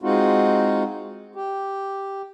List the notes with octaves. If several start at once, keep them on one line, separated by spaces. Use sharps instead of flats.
G#3 C4 D#4 F4 F#4
G4